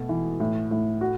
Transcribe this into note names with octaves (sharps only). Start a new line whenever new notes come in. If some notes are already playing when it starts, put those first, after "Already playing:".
Already playing: B2 A3
E3
A2
A2
F#4